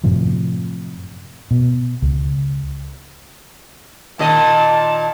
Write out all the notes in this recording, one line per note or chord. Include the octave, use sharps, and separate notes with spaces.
F#2 A2 C3 F3
B2
C#2
A#2 D#3 D#5 A5